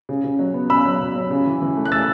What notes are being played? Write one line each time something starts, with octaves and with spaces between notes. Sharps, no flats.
C#3
C#3
F#3
B3
C#3 B5 E6
F#3
C#3
F#3
C#3
E3
E3
A3
F#6
A3 E6 A6